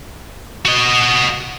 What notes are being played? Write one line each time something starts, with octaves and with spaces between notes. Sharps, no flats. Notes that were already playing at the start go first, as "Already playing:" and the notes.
F#4 D#5